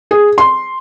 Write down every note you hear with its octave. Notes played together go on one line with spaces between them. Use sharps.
G#4
C6